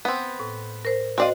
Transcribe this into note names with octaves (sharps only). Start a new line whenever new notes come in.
B3 C4
A2
A#4 C5
C4 F#4 C5 D5 D#5 F5